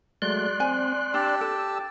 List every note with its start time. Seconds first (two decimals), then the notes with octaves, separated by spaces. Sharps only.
0.22 F#3 G#3 A3 D5 C6 F#6
0.60 C4 G#5
1.14 D4 G4 A5 E6
1.41 A4 G5